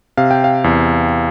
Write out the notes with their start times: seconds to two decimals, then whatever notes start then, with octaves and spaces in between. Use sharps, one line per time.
0.17 C3 F5
0.31 G5
0.44 F5
0.64 E2